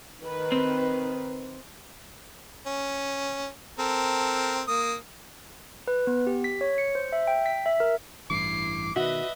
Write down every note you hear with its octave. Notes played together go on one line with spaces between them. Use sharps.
D#3 B4
C4
C#4
C4 A4 A#4
A#3 D#6
B4
B3
G4
B6
C#5
C#7
C5
E5
G5
B6
E5
A#4
A1 G2 E3 E4 D6 C7
B2 D#3 F#4 B4 D#5 E5